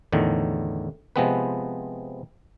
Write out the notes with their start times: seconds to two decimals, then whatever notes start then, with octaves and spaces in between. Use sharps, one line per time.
0.12 E2 A2 D3 D#3
1.16 C3 F3 G#3 B3 C4 B4